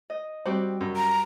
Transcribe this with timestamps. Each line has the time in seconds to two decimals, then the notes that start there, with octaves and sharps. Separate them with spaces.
0.10 D#5
0.46 G3 C4 F#4 G4
0.81 F#2
0.96 A#5